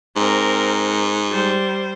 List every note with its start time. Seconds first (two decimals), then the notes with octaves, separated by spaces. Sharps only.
0.16 G#2 C4 A#4
1.30 G3 C5